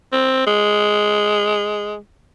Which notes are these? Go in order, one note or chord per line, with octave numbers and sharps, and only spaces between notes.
C4
G#3